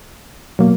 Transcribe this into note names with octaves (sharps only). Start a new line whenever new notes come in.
B2 F#3 A#3